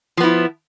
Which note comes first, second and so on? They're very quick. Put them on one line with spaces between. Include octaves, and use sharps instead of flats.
F3 B3 E4